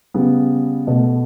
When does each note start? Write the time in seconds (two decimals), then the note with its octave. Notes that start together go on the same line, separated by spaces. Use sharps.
0.14 C#3 G3 B3
0.87 B2 A3